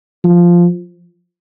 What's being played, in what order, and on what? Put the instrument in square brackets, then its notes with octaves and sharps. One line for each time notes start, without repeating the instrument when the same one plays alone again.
[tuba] F3